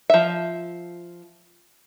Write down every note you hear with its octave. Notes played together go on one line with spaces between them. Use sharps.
F3 E5